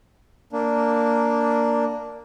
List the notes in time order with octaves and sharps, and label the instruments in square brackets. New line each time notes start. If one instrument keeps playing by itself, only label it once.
[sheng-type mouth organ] A#3 D4